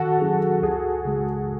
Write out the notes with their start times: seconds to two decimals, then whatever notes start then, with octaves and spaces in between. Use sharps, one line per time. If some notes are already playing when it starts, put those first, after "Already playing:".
Already playing: D#3 F#4 A4
0.20 F#3 C#4 E4 G#4
0.62 C#2 G#4
1.05 C#3 G#3